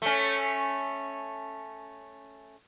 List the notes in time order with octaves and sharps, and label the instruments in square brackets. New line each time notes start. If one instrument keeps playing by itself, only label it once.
[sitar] A3 C#4